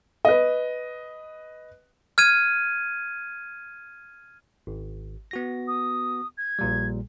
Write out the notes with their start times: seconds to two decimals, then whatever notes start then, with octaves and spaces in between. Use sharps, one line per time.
0.25 B4 D#5
2.18 F6 G#6 D#7
4.67 G#1
5.31 B3 F#4 A#6
5.68 D#6
6.38 G#6
6.59 A#1 A#2 G3